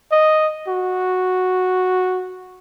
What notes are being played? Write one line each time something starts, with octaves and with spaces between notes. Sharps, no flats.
D#5
F#4